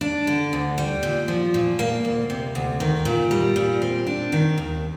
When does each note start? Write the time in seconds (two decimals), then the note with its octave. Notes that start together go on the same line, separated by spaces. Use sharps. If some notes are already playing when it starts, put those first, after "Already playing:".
0.01 D4
0.27 D3
0.53 D2
0.78 G3
1.03 A#2
1.28 F3
1.54 A#2
1.79 A#3
2.05 D2
2.30 C3
2.55 D2
2.80 D#3
3.05 A#2
3.31 G3
3.56 A#2
3.82 C4
4.07 D4
4.32 D#3
4.58 D#2